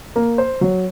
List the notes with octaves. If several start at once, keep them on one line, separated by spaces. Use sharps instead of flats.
A#3
C5
F#3